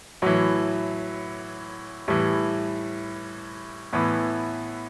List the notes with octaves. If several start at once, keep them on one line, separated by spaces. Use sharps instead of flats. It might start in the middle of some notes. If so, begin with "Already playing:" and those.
A2 E3 F#3
A2 E3 G3
A2 E3 B3